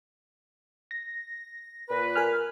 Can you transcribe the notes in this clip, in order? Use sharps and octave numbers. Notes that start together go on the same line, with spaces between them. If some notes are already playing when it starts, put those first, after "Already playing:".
A#6
A#2 B4
A#4 G#5 F6